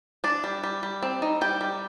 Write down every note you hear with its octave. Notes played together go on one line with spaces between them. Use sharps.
D4 D5
G3
G3
G3
C4
D#4
G3 G5
G3